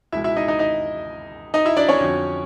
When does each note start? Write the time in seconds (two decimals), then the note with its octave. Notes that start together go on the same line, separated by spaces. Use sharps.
0.12 C#2 B2 G#3 E4 E5
0.24 E4 E5
0.36 D#4 D#5
0.48 D#4 D#5
0.59 D#4 D#5
1.54 D#4 D#5
1.65 E4 E5
1.77 D4 D5
1.89 C#4 C#5
2.00 F2 D3 F#3